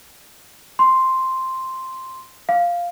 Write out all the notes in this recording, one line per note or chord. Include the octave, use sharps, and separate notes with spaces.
C6
F5